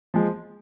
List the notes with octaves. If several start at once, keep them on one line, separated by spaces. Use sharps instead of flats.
F3 G#3